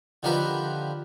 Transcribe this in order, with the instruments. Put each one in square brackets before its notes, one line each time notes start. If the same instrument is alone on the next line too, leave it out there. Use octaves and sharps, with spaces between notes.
[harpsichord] D3 D#3 F3 G4 A#4 B4